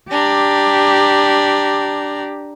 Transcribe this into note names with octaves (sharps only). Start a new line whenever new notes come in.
D4 G4 A#5